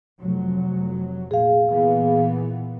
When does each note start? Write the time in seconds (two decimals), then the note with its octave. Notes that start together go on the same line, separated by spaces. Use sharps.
0.20 F1 F#3
1.31 A#2 G#4 F5
1.70 A#2 E3 B3